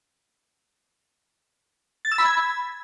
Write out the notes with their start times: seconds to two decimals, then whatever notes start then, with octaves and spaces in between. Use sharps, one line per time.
2.05 A6
2.12 E6
2.18 B5
2.25 G#6